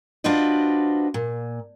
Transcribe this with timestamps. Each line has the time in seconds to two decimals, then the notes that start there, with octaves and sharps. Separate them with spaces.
0.24 D4 F4 F#4 B4 C5 D#5
1.14 A#2